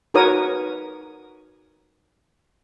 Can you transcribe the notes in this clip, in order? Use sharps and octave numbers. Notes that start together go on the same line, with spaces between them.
D#4 F#4 A#4 B4 C#5 D#6